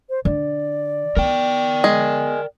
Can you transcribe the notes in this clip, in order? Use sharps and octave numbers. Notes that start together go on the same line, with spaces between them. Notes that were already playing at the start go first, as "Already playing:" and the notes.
C5
D3 D5
B3 A#4 G5
G#3